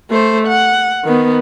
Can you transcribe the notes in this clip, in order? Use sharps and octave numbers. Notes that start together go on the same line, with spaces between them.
A3 C5
F#5
D#3 B3